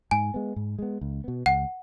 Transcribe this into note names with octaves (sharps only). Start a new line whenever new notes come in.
G#2 G#5
G#3 B3
G#2
G#3 B3
C#2
B2 B3
C#2 F#5